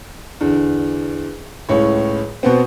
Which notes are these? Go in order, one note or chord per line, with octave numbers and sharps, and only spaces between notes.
E2 D3
C#2 A2 C#5
B2 B3 C4